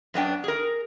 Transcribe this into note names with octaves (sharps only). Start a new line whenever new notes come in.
F#2 B3 D4 G5
G#4 A#4